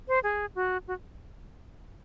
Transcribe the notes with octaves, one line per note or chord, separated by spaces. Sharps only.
C5
G#4
F#4
F#4